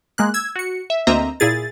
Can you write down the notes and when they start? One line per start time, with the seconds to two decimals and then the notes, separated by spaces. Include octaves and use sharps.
0.18 G#3 A#3 F#6
0.34 E6 G#6
0.56 F#4 C#7
0.90 E5
1.07 D2 A#3 C4 D#5 E5 A#5
1.40 A#2 E4 G#4 A6